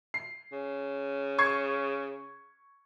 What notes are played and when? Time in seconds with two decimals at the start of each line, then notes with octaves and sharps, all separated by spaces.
0.14 C7
0.52 C#3
1.39 C#6 G#6 C7